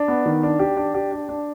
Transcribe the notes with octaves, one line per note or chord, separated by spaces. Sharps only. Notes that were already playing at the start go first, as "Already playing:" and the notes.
Already playing: D4
B3
D#3
D4
G4
D4
G4
D4
D4